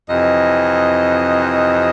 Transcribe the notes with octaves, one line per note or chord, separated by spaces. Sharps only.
F2 C3 E3 D#5